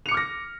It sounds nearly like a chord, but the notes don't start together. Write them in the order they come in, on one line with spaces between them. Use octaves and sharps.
F7 C#7 D6 F6 A#6